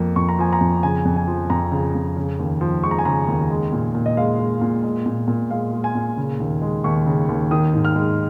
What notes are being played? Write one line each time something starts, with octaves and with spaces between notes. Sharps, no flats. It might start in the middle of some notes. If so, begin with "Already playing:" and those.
Already playing: F2 F3 A#3
F2 C#6
A#5
F3 G#5
A#5
F2
C#3 G#5
F2
G#5
F3
F2 A#5
C#3
F2
C#3
D#2
F3
G#3 C#6
A#5
G#5
C#3 A#5
D#2
G#3
A#2
A#2
D#5
G#3 F5
G#3
A#2
G#3
A#2
A#2
G#3 F5
G#3
G#5
A#2
C#3
D#2
G#3
D#2 C#6
C#3
D#2
D#3 D#6
G#2
F6
G#3